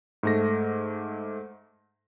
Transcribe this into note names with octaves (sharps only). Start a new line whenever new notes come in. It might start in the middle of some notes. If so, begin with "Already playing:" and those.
G#2 A3 A#6